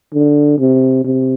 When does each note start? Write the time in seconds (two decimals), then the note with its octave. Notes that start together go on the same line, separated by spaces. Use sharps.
0.14 D3
0.59 C3
1.04 C3